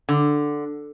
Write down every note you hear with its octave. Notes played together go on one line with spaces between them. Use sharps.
D3